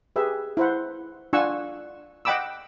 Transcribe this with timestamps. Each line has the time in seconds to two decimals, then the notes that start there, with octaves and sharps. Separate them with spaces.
0.16 G4 G#4 B4 E5
0.57 E4 C5 F#5
1.33 D4 F4 F#5 G#5 C#6 E6
2.25 D#5 F#5 G5 B5 D6 E6